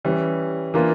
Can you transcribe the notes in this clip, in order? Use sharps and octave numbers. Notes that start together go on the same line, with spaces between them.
E3 G3 C#4
E3 A#3 D4 F4